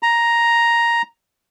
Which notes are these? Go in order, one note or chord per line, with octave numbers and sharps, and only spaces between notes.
A#5